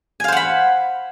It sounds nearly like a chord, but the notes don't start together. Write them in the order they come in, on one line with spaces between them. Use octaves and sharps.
G#5 F5 C5 F#5 B5